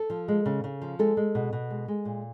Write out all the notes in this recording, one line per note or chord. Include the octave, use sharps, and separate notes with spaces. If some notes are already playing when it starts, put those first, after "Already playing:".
Already playing: A4
F3
G#3
C#3
C#3
F3
G#3 A4
G#3
B2
B2
G#3
G#3
A#2